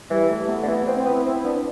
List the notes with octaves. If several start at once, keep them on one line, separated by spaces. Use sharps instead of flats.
E3 G3
A3
A3
B3
D3
E3 B3
B3 C4
C4
B3
E4
C4 E4
B3 D4